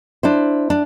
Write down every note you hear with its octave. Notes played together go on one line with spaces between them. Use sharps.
D4 E4 C5
D4